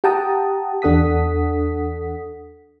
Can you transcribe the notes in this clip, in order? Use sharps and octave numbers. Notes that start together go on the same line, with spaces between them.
G4 F#5 G5 A5 A#5 D#6
E2 D4 A4 F#5 D#6 B6